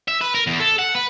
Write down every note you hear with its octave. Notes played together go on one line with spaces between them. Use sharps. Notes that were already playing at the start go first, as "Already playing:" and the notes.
E5
B4
A#4
E2
A4
F#5
B4